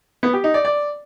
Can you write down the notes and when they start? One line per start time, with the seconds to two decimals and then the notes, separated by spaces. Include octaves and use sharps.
0.23 B3
0.33 G4
0.44 D#4
0.54 D5
0.65 D5